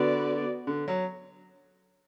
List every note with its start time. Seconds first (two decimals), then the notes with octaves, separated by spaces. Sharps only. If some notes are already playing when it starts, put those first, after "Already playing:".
Already playing: D3 B3 F#4 B4 D5
0.67 D3
0.88 F#3